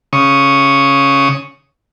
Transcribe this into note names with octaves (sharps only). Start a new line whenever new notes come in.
C#3 C#6 D#6